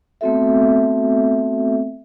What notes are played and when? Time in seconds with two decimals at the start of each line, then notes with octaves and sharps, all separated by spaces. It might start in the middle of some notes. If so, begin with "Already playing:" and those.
0.21 A3 B3 C4 F#4 A4 E5